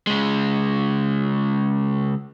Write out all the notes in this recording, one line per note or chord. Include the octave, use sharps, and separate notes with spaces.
C#3 G#3